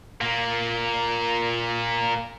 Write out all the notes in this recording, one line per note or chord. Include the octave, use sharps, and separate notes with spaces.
A#2 A#3